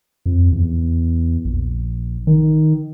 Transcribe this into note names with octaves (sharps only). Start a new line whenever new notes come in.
F2
E2
A#1
D#3